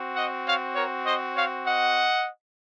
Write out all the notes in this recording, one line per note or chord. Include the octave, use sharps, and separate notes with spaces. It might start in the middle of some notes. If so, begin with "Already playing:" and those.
Already playing: C4 F#4
D#5 F#5
C#5 F5
A#4 C#5
C5 D#5
C#5 F5
D#5 F#5